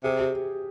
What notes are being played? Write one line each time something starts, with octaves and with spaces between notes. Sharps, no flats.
C3 G#4
G4